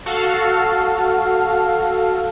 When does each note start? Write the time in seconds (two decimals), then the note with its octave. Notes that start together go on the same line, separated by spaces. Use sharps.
0.06 F#4 A4 F5